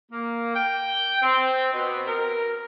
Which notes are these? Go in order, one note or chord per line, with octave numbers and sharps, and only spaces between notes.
A#3
G5
C4
B2
A#4